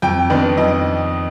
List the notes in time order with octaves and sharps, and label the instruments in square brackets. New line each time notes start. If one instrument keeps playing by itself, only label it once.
[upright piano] F2 G5
D#3 B3 D4
F2 D#5